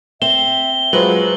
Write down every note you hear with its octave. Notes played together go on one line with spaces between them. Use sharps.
C4 E5 E7 G7
F#3 G#3 F4 B4 C5 F#7